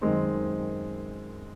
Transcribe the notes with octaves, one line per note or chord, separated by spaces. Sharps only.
F#2 D#3 G#3 C4 D#4